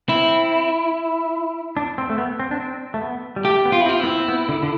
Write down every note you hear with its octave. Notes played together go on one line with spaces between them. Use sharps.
C4 E4
D4
C4
A3
B3
C4
D4
C4
A3
B3
G3
A3 G4
B3
F4
E4
C4
F4
B3 E4
C4
C4
B3
D3
D3